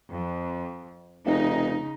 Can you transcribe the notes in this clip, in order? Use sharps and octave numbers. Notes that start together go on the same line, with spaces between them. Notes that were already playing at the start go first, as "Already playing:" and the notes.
F2
F1 C#3 D#4